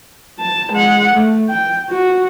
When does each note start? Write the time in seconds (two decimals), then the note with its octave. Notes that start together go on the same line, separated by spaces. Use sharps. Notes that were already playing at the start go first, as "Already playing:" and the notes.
0.39 A5
0.72 G#3 F#5
1.13 A3
1.49 G5
1.90 F#4